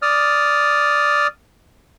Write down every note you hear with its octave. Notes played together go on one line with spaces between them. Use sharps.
D5 D#6 F6